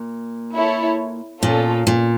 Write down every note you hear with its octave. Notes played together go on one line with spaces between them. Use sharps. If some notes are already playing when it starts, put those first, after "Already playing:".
Already playing: A#2
E4 A4 C#5
A#2 C#4 F4 A4
A#2